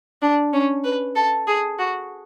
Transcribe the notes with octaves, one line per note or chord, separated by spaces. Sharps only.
D4
C#4
B4
A4
G#4
F#4